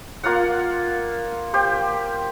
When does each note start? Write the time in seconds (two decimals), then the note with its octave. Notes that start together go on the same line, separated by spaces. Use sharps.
0.24 A#3 F4 F5 F#5
1.54 G4 C5 G5